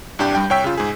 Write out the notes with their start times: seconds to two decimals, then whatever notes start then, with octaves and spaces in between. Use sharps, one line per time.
0.19 C2 G2 D4 G4 G6
0.35 G2 G3 G5
0.50 C2 C#5 G5 E6 B6
0.64 C#3 F4
0.78 G#2 G#4